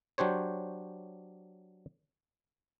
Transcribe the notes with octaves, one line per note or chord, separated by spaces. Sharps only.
F#3 D4 G4 C5 C#5